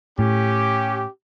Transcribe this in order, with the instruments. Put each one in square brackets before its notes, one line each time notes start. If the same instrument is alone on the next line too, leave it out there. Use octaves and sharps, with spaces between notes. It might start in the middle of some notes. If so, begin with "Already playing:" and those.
[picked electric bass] A2 [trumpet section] C#4 G4